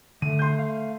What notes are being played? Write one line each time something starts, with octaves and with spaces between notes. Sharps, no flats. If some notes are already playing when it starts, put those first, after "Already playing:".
D3 A3 D#7
C6 G6
F5